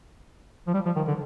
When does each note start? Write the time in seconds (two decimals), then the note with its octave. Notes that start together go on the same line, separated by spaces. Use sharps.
0.67 F3
0.74 G3
0.85 F3
0.96 D#3
1.07 D3